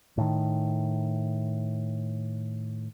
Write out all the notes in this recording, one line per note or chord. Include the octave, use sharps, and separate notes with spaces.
A2 D#3